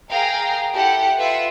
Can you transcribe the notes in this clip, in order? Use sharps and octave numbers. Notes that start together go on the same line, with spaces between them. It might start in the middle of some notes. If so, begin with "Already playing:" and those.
G#4 A#4 F5 G5 A#5
E4 G4 A4 F#5
F4 B4 E5 F#5